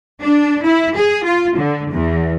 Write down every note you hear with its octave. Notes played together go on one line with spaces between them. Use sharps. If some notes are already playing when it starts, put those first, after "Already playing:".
D4
E4
G#4
F4
D3
E2